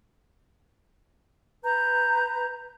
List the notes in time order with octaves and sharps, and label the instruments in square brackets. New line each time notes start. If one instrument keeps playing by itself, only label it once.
[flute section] B4 A#5 G6